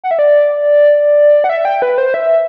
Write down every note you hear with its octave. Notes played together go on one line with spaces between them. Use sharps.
F#5
E5
D5
F#5
E5
G5
B4
C5
E5